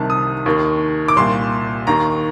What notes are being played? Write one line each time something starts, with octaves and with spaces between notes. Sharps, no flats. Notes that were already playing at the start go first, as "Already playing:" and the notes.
Already playing: C2 C3 D#3 A5
D#6
D#2 D#3
D6
C2 A#2 C6
D#2 D#3 A#5